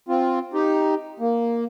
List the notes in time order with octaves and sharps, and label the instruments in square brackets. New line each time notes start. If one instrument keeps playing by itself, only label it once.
[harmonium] C4 F4
D#4 G4
A#3